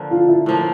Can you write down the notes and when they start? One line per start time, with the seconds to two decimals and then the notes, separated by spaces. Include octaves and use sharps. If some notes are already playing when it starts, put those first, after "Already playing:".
Already playing: D3 F3 A#3
0.11 F4
0.29 E4
0.46 A2 F3 A#3